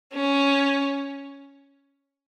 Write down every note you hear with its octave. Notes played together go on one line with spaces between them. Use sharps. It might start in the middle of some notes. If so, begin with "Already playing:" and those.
C#4